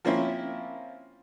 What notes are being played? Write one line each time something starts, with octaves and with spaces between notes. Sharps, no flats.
F3 A#3 C4 C#4 E4